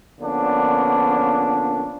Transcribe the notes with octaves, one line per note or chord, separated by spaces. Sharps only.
D3 F3 A#3 B3 C#4 D4